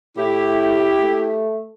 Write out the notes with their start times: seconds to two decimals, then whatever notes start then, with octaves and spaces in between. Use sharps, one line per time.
0.17 A2 E4 G4
1.00 A3